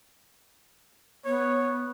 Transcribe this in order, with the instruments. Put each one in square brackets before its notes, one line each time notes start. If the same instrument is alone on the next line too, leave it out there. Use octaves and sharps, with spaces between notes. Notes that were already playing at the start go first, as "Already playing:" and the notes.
[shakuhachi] B3 [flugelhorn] C#5